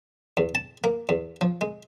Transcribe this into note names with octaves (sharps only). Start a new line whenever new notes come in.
E2
A5
A#3
E2
F3
G#3